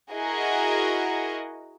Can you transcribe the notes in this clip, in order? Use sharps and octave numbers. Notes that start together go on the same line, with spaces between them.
E4 F#4 G#4 A#4 D#5